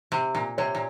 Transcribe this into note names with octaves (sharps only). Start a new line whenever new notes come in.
C3
A#2
C3 C#5
A#2